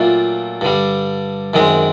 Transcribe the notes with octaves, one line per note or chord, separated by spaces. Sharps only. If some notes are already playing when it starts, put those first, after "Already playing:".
Already playing: A#2 F#3 A3 D4 F4
G2 D3 G3
F#2 D#3 G#3 C4